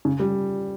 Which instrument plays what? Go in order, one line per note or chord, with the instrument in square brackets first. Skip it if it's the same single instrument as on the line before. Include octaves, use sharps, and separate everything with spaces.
[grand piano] C#3
G3